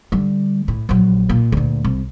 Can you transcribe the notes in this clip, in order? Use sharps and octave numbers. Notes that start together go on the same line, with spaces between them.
D3 G3
A2
A#1 F#3
A#2
D2 A#2
C2